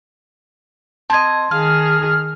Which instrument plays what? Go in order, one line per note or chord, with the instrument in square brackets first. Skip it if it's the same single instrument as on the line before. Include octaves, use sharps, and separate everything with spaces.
[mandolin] C4 D#5 [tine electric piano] A5 G#6
[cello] D#3 G#4 [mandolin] F5 [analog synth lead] F6